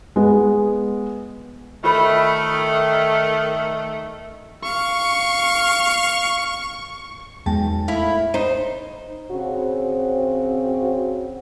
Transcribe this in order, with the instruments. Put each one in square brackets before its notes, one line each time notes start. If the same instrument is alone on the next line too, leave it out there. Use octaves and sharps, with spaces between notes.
[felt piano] G#3 B3
[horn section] D#3 A3 [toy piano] F4 C5 B5
[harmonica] F5 [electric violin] C#6
[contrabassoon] B1 [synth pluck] E2 G5 A#6 [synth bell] G#3 A5
[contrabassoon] A2 [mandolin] E4 [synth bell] F5
[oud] D#4 C5
[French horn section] C#3 C4 F#4